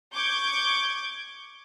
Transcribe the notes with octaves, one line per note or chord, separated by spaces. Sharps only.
C#6 D6 G6 G#6 D7